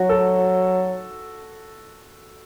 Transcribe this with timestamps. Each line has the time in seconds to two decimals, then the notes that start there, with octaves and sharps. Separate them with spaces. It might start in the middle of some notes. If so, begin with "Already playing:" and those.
Already playing: F#3 F#4
0.09 A4